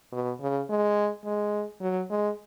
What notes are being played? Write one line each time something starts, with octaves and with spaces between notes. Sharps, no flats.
B2
C#3
G#3
G#3
F#3
G#3